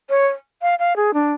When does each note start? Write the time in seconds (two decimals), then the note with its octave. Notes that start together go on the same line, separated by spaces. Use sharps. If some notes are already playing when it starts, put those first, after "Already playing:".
0.10 C#5
0.62 F5
0.79 F5
0.96 G#4
1.14 D4